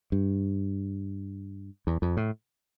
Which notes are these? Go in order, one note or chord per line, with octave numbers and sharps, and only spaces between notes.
G2
E2
F2
A2